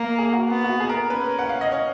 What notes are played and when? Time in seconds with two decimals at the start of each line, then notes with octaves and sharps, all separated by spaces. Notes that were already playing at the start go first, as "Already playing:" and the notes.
Already playing: A#3
0.19 G#4
0.33 F#4
0.49 B3
0.64 F#4
0.80 G#4
0.89 A#4
1.10 C#4 B4
1.39 F#5
1.49 F5
1.61 D#5
1.72 C#5